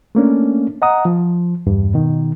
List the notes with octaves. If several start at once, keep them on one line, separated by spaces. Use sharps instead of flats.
A3 A#3 C#4 D4
D#5 F#5 A#5 D#6
F3
E2 G2
B2 D#3